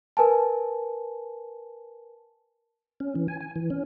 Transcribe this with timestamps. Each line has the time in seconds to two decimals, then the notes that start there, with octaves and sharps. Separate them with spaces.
0.17 A#4 B4 G#5 A5
3.00 C#4
3.15 E3
3.28 G#5
3.40 G#5
3.56 E3
3.70 C#4